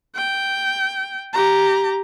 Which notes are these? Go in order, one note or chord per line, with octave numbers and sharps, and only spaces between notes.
G5
G4 A#5